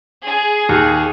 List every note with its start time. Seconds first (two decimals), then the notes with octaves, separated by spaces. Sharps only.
0.25 G#4
0.69 D#2